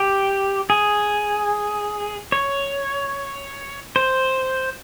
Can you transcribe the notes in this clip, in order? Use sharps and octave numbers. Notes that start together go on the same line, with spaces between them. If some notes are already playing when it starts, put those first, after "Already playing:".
Already playing: G4
G#4
C#5
C5